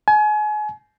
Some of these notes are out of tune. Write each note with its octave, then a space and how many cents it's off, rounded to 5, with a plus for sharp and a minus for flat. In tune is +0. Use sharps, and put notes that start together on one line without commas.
G#5 +35